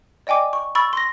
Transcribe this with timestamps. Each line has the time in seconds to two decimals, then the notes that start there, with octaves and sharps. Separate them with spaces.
0.27 D5 D#5 G5 G#5 D6
0.53 C#6
0.75 B5 C#6 E6 A6
0.93 C6 A#6